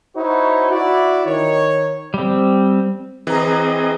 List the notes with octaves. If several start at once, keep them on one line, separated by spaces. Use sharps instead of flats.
D#4 E4 F#4 C5 C#5
E4 F#4 D5
D#3 C#5
G3 C4
E3 C4 G#4 D#5 A#5